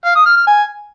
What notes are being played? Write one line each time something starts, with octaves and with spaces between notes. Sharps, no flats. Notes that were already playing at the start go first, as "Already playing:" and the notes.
F5
D#6
F6
F6
G#5